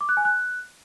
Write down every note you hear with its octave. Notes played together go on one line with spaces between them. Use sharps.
D6
F#6
G#5
F#6